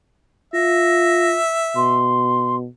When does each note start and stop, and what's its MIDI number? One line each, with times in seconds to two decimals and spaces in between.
0.54 1.38 65
0.54 2.11 76
0.54 1.30 94
1.76 2.66 47
1.76 2.56 84